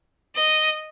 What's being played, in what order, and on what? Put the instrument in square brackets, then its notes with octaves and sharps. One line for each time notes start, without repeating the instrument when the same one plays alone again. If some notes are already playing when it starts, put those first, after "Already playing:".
[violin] D#5